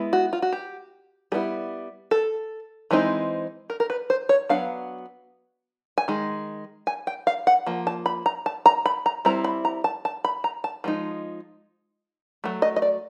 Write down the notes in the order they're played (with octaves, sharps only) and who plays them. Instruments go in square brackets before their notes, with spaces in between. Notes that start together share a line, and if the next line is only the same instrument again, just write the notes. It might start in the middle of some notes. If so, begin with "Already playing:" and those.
Already playing: [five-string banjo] G#3 B3 E4
F#4
F4
F#4
G4
G3 B3 E4 G#4
A4
E3 G#3 C4 D#4
A#4
A#4
B4
C5
C#5
F#3 B3 D4 F5
G#5
D#3 G#3
G#5
G5
F5
F#5
F3 A#3
A5
B5
A#5
A5
A#5
B5
A#5
G3 C4 E4 A#5
B5
A#5
A5
A5
B5
A#5
A5
F3 G#3 D#4
F#3 A3
D#5
D#5
D5